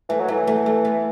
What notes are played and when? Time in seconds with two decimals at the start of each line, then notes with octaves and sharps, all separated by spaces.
0.09 E3 A3
0.20 F#3
0.28 E3 A3
0.47 A3
0.66 A3
0.85 B3